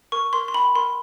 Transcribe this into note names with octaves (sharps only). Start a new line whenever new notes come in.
A#4 C#6
A#4 C6
C6
G5 B5
A#4 C6